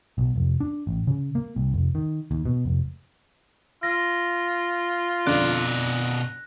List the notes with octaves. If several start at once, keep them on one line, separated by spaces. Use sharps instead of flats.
B1
F1
D4
A1
C#3
A#3
C2
F1
D#3
D#2
B2
F1
F4 A#6
F2 B2 D3 D4 D5 F#6